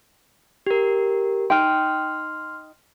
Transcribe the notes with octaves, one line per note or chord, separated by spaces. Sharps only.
G4 A#4
D#4 G5 C6 F6